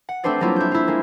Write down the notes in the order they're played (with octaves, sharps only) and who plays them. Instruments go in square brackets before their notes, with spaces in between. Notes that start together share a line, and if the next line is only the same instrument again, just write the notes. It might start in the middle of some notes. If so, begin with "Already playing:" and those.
[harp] F#5
A3 C4 D4 B4 C5 D5
F#3 G3 A#3 E4 F4
E4 G6
E4 F4
G#3 A#3